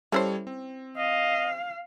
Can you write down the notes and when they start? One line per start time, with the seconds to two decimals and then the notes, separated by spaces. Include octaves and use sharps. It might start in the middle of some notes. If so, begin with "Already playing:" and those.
0.12 G3 C#4 E4 A4 C5 C#5
0.47 C4
0.97 D#5 F5